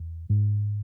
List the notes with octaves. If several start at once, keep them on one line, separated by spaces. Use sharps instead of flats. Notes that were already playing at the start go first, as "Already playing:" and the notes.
Already playing: E2
G#2